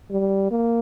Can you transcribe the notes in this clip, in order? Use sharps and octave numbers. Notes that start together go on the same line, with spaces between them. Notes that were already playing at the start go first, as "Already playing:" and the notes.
G3
A#3